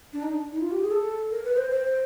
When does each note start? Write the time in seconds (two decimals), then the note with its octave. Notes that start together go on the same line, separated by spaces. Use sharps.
0.13 D4
0.23 D#4
0.32 D4
0.52 D#4
0.58 E4
0.61 F4
0.71 G4
0.82 G#4
0.91 A4
1.31 A#4
1.45 B4
1.57 C5
1.71 C5